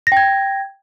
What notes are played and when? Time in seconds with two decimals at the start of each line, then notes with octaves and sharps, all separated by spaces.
0.07 A#6
0.12 G5
0.17 G#6